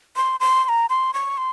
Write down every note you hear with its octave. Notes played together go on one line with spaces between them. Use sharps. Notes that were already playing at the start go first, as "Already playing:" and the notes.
C6
C6
C6
A#5
C6
C#6
C6